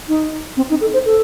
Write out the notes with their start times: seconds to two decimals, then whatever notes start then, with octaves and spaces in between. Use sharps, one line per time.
0.08 D#4
0.57 C4
0.70 D#4
0.81 A4
0.93 C5
1.05 A4